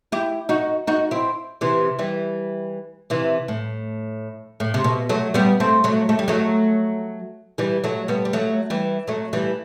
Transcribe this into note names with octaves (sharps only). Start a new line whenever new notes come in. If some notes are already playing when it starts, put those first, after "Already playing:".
E4 G4
D#4 F#4
D#4 F#4
C4 E4
C3 E3
E3 G3
C3 E3
A2
A2
C3
B2
F#3 A3
G3 B3
A3 C4
F#3 A3
A3
G3
F#3 A3
E3 G3
F#3 A3
G3 B3
G3
F#3 A3
E3 G3
F#3 A3
E3 G3